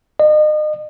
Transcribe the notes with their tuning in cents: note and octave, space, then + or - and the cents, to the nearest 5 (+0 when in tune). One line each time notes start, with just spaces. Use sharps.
D#5 -35